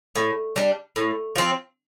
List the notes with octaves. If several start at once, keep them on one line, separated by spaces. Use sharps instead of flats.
A2
G3 D4
A2
F3 C4